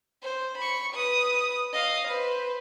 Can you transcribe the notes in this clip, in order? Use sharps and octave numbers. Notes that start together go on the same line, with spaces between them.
C5
B5 C#6
B4 D#6
D#5 F5
B4 C5